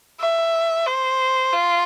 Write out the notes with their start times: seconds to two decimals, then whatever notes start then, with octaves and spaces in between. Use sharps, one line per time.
0.20 E5
0.86 C5
1.53 F4